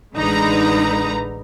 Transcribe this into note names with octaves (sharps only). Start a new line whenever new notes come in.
A1 D3 G#3 D#4 B4 A#5